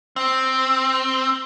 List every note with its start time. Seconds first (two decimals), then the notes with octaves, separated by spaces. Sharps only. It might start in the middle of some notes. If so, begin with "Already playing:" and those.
0.16 C4